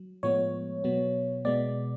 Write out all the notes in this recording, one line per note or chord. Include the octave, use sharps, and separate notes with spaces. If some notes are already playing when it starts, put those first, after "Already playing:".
Already playing: F#3
A2 F3 G#3 B3 C#5
B2 F#3 B3
B2 G#3 B3 D5